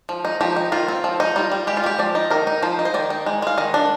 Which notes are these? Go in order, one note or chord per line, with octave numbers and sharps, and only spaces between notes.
F3
D#4
F3 G4
D#4
D#3 F4
C4
F3
D#4
G3 F4
G3
G#3 G4
F4
G#3 G4
F3 D5
D#4
D#3 A#4
D#4
F3 C5
D#4
C5
D#3 D5
D#4
G#3
G#3 F5
D#3 D#5
D4